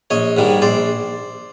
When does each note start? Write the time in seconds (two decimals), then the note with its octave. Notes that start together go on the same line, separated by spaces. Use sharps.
0.10 A#1 C#5 D#5
0.37 G#2 D#3 G3
0.62 A#1 C5 D5